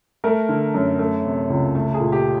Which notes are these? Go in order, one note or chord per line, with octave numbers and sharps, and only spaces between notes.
A3 A#4
D3
F#2
A3
C3
C#2
A3 A4
G#4
A#2
G4